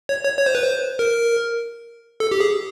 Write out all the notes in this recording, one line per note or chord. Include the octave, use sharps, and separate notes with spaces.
C#5
C#5
C#5
C5
B4
C5
A#4
A4
G4
G#4